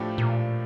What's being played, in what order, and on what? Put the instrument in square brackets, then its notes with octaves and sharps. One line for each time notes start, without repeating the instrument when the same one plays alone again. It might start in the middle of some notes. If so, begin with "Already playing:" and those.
Already playing: [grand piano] A2 F3 A3 D4 G4
[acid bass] A#2